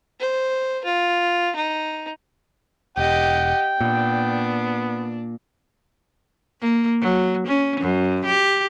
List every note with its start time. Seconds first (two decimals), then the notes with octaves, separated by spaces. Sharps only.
0.20 C5
0.85 F4
1.56 D#4
2.97 E1 G4 D#5 F#5 G5
3.81 A#2 B3 D4
6.61 A#3
7.02 F#3
7.47 C#4
7.81 F#2
8.26 G4